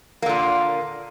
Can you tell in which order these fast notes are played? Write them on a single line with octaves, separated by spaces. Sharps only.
A#3 D3 A#2